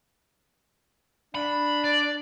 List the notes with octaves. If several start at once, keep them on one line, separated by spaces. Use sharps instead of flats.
D4 B5
D5